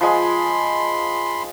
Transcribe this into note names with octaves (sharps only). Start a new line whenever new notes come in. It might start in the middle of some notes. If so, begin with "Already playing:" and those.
F3 G#3 B5 C6